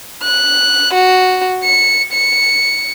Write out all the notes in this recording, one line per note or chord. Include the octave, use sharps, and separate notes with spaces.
F#6
F#4
C#7
C#7